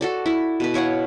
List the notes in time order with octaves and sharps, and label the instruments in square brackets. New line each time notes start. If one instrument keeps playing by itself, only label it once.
[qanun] F#4 A4 D5
E4
B2 B4
E4 C#5 F5 F#5